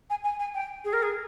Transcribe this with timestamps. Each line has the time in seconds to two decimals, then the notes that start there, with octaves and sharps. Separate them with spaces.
0.10 G#5
0.24 G#5
0.39 G#5
0.55 G5
0.85 G#4
0.93 A#4
1.03 G#4